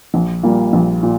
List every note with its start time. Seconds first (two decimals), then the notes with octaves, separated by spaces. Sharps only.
0.14 A#1
0.43 A#2 G3 A#3
0.73 A#1
1.03 A#2